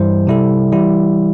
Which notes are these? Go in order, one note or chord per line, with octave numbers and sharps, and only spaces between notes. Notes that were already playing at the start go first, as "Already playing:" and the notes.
Already playing: G2 E3 G3 E4 C5
C3 G3 E4 A4
E3 G3 E4